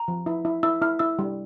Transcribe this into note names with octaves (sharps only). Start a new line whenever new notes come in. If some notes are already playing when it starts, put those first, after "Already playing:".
Already playing: A#5
F3
E4
E4
E4 E6
E4 F6
E4 E6
G3